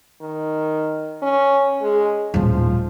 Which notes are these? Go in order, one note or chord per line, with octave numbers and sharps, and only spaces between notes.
D#3
C#4
G#3
D#1 A2 F3